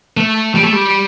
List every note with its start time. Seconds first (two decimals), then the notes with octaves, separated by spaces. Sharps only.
0.17 A3
0.55 G3
0.64 A3
0.73 G3